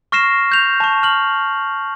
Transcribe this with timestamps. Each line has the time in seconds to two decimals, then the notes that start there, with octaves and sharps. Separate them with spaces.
0.12 C#6 F6 A#6 C7 E7
0.52 G6 F7
0.80 A5 C#6
1.03 F6 F#7